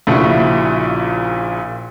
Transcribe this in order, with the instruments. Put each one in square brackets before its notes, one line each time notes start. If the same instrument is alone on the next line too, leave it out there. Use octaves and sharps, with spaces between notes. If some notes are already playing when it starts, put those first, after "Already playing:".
[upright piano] A#1 A#2 C#3 E4 F#4 C#6